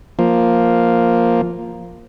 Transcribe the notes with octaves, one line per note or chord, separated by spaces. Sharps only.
F3 A#3